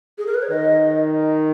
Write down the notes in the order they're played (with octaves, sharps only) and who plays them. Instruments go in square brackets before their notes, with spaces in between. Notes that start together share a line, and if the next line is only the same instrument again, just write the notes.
[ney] G#4
A#4
B4
C#5
[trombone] D#3 [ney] D#5